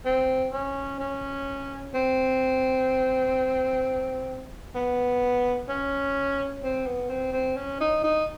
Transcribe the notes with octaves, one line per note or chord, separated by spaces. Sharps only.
C4
C#4
C#4
C4
B3
C#4
C4
B3
C4
C4
C#4
D#4
D#4